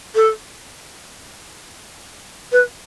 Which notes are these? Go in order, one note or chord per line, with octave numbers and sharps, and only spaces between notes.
A4
B4